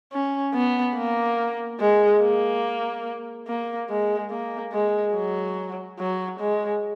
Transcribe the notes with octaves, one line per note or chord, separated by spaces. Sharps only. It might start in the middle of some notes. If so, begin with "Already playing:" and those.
C#4
B3
A#3
G#3
A#3
A#3
G#3
A#3
G#3
F#3
F#3
G#3